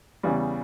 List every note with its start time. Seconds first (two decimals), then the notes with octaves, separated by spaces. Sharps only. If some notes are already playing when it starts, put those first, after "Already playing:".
0.23 E2 C#3 E3 G3